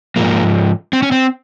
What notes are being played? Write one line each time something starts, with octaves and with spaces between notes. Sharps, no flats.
G#2 F3 A#3
C4
C#4
C4